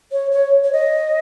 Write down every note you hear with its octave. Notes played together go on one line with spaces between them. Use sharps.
C#5
C#5
C#5
D#5